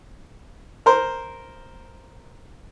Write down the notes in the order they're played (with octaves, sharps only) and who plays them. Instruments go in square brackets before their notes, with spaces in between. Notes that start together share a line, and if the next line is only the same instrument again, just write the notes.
[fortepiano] A#4 C5